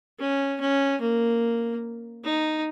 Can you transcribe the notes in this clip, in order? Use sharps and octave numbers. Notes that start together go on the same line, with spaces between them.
C#4
C#4
A#3
D#4